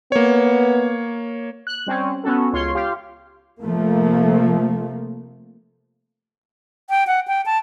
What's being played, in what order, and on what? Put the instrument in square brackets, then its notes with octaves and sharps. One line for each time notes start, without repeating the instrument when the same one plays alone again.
[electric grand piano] A#3 C#5 [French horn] B3
[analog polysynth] F#6
G3 C4 C#4
B3 C#4 F#4 A4
C#2 F4 C#5 C6
F4 G4 F5
[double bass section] C3 F3 A3 A#3
[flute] G5
F#5
G5
A5